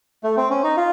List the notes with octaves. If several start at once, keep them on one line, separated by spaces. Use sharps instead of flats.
A3
C4
C#4
D#4
F4